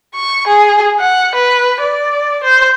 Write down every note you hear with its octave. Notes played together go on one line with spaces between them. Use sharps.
C#6
G#4
F#5
B4
D5
C5